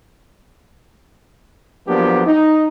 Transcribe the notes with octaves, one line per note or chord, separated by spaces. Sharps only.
F3 F#3 A#3 B3 D4 G4
D#4